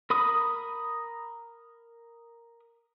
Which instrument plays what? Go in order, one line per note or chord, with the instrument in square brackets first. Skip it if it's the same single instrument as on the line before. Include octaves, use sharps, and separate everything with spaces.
[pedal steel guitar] A#4 B5 D#6